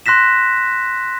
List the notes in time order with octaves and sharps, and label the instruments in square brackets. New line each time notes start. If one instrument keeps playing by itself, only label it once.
[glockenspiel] C6 F#6 A#6 B6 E7